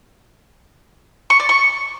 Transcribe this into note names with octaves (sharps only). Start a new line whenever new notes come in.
C#6
D5
C#6